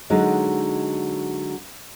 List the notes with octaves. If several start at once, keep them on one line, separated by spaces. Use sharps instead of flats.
D3 F#3 G#3 D#4